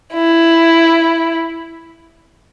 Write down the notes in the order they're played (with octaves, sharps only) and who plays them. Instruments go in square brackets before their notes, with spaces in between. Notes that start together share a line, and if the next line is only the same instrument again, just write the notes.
[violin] E4